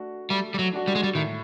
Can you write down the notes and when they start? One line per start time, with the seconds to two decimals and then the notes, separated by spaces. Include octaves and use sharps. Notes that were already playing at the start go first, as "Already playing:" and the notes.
Already playing: A3 D4 F#4
0.30 G3 A3
0.54 G3
0.59 F#3
0.73 D4 F#4
0.88 G3
0.95 G#3
1.03 G3
1.14 A2 D#3